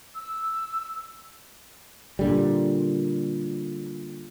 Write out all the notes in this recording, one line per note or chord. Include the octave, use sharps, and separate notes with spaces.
E6
A#2 D3 G3